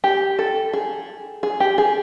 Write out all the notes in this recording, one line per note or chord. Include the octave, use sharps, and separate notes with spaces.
G4
A4
G#4
G#4
G4
G#4